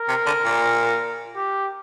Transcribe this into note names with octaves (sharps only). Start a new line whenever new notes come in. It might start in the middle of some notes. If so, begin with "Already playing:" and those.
Already playing: A#4
C3
D3
A#2
G4